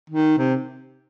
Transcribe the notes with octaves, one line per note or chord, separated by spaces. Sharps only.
D#3
C3